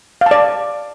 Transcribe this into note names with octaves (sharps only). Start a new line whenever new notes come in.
D5 F5 A5